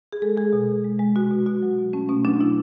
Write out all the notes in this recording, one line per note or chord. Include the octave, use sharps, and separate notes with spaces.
G#4
G#3 A4
G#3 G#4
B2
B2
G#3
G#3
B2 F#4
B2
B2 F#4
F#3
B2
A3 C#4
B2 C#4
F#3 D4
B2 E4